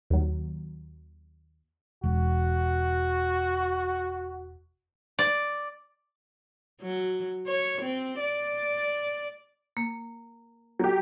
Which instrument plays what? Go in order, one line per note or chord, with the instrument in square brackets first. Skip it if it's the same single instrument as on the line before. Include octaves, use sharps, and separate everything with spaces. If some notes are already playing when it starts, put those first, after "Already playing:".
[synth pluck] D#2 F#3
[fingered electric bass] E1 [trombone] F#4
[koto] D5
[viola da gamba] F#3
C#5
C4
D5
[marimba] A#3
[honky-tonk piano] F#3 G4